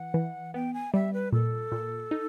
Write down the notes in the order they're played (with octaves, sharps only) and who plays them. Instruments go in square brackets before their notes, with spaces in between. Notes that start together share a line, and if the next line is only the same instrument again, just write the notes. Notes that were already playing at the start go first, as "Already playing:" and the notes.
Already playing: [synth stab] E3 [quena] F#5
[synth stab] E3
[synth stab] B3 [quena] G5
[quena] G#5
[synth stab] G3 [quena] E5
[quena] B4
[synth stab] A#2 [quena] A4
[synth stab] A#2
D#4